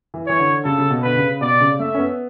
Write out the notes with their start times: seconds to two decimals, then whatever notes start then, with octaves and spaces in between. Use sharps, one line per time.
0.14 E3
0.27 E3 C#5
0.39 D3
0.64 C#3 A4
0.78 C#3
0.90 B2
1.03 D3 B4
1.16 C#3
1.41 B2 D5
1.60 C#3
1.79 A3 E5
1.94 C#4
1.98 B3